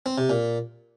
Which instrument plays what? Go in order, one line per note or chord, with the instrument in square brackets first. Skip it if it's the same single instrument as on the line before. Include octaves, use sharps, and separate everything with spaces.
[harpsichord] C4
C3
A#2